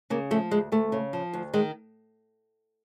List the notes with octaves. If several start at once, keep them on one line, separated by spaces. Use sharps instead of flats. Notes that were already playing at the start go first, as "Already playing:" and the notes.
C#3 A#3
F3 A3
D2 G#3
D2 A3
C#3
F3
D2
D#3 G#3